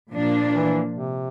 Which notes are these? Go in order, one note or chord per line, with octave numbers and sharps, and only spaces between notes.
A#2 F3 A#3 D4
E3
C3